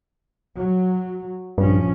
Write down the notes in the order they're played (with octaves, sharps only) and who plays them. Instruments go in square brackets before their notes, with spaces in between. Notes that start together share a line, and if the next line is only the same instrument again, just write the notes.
[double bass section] F#3
[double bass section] A#1 F3 C#4 [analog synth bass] G2